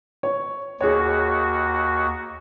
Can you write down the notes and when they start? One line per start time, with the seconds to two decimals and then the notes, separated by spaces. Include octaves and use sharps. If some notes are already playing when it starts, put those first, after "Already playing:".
0.23 C#5
0.81 D#2 F#4 G#4 C#5